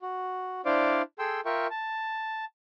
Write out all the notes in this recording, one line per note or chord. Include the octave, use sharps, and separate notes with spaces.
F#4
D4 E4 C5 D5 F5 D6
G#4 A4 G5 C6 E6
F4 A#4 E5 G5 C#6
A5